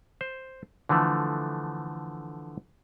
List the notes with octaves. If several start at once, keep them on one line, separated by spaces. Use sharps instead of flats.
C5
D3 E3 F3 A3